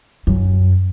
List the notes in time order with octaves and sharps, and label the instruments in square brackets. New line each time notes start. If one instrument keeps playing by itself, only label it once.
[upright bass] F#2